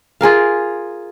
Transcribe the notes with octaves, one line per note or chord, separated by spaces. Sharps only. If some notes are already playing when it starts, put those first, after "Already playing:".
F4 G#4 A#4 F5